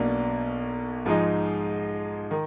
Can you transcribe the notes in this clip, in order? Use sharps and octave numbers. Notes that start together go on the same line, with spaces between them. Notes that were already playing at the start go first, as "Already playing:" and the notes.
Already playing: B1 B2 A#3 D4
G#2 F3 G#3 D#4
D#3